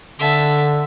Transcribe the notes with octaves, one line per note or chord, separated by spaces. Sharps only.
D3 E5 A5